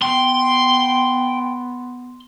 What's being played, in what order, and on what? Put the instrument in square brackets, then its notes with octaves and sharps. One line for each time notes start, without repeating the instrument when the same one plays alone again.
[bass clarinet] B3 [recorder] G5 [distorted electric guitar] C6